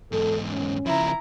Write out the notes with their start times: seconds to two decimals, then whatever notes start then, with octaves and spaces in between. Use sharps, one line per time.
0.12 E2 G#2 A4
0.52 C#4
0.86 C#3 F3 E4 A#5